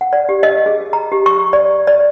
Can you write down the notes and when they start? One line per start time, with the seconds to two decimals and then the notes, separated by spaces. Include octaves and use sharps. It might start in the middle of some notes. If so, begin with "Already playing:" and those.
0.01 F#5
0.13 D5
0.29 G4
0.43 D#5
0.66 G#4
0.93 A#5
1.12 G4
1.26 C#6
1.53 D5
1.87 D5